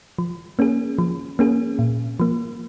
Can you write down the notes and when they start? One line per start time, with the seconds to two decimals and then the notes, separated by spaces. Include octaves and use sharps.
0.18 F3
0.59 A#3 C#4 G#4
0.99 F3
1.39 A#3 C#4 G#4
1.79 A#2
2.20 F3 A#3